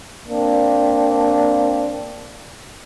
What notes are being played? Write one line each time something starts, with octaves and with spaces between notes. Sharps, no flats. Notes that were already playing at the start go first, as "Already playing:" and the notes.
A#3 C4 D4